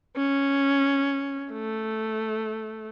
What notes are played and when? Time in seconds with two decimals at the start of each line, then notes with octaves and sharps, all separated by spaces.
0.16 C#4
1.52 A3